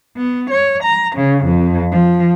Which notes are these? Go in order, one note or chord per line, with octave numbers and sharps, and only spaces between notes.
B3
C#5
A#5
C#3
F2
F3